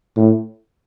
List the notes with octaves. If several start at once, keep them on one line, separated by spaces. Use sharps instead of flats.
A2